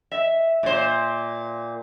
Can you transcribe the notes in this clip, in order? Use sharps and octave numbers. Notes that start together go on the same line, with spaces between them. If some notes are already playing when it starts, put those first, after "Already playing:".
E5
A#2 C5